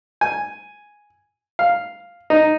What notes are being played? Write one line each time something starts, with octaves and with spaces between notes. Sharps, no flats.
G#5
F5
D#4